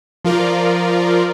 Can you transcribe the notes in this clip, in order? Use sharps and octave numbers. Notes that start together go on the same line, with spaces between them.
F3 F4 A#4 D5